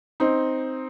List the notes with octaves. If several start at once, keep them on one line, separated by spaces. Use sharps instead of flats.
C4 D#4